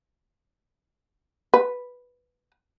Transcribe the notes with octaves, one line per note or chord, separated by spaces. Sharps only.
B4